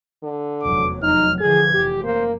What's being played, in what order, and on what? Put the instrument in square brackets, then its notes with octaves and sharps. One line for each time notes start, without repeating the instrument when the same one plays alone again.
[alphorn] D3
[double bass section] F1 E2 F#3 [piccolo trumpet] D6
[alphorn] D#4 [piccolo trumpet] F6
[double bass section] D3 E3 F3 [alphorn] G#4 [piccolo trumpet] G#6
[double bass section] F1 [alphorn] G4
[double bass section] F#2 [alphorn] A#3 [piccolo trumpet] C5